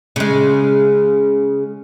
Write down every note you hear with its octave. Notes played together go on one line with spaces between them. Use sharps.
C#3 G#3